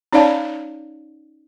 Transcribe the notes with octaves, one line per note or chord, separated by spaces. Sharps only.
C#4 D#4 C#5 D5 F5 A5